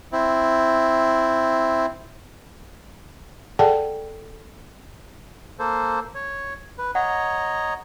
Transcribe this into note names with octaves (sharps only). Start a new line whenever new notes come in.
C4 E4
G#4 A4 D5 F#5 G5 A5
A#3 A4 C5
C#5
B4
C#5 D#5 F#5 A#5